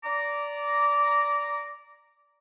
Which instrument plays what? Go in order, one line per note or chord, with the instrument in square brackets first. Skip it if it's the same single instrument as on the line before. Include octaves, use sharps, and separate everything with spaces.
[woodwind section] D5 A#5 D6